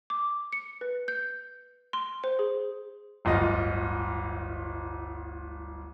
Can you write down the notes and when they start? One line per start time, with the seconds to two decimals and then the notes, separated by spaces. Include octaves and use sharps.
0.10 D6
0.53 C#7
0.81 B4
1.08 G6
1.93 C6
2.24 C5
2.39 G#4
3.25 D1 G1 F4 D#5